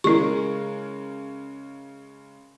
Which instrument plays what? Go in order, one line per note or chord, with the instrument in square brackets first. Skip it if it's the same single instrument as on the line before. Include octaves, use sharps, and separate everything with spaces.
[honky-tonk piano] C#3 G#3 A#4 [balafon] E4 C#6